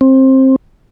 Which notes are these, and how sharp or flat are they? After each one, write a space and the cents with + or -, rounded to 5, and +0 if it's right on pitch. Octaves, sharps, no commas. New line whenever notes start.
C4 +20